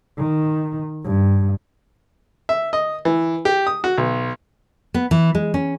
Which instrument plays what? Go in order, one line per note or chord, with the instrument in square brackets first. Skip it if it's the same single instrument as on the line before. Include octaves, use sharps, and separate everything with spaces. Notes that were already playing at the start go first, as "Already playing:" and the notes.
[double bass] D#3
G2
[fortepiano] E5
D#5
E3
G4
D#6
F#4
B1
[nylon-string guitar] B3
E3
G#3
C#4